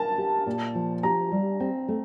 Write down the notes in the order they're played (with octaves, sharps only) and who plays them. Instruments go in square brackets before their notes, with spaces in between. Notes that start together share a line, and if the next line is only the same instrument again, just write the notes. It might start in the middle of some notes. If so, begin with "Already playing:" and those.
Already playing: [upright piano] A#4 A5
[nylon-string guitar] G4
A#2
F3
[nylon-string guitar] G4 [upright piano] A#5
[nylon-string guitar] G3
C4
A3